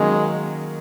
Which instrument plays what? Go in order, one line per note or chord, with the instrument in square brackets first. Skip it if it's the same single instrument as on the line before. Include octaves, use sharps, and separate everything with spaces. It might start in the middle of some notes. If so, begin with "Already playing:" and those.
Already playing: [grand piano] D#3 F#3 A#3 C#4 [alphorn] G#3